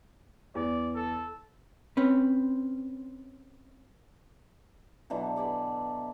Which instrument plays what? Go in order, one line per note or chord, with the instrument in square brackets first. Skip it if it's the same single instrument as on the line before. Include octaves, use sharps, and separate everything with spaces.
[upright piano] E2 [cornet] D5
[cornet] A4
[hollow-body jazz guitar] C4 C#4 B4
[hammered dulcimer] B2 D3 E3 F#3
A4 D5 G#5 B5